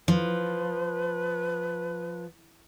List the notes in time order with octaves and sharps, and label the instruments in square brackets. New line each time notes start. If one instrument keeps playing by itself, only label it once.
[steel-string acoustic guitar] F3 [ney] B4